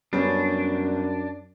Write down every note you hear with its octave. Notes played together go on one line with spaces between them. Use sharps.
F#2 G3 B3 C#4 D4